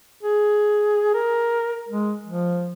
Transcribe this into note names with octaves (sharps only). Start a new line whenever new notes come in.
G#4
A#4
G#3
F3